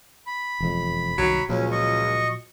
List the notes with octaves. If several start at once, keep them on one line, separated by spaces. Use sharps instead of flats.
B5
E1 F2
C2 F#2 D#3 F#3
C#2 A#2 F3 F#3 C#4
D#5 C#6